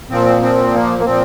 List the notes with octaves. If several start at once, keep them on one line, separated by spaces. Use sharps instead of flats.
A#2 F3 C4
C4
A#3
A#3
A#2 F3 C4